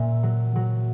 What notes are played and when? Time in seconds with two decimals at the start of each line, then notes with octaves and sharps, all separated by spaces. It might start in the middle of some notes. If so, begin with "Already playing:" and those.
Already playing: A#2 E5
0.23 F#3
0.56 F#3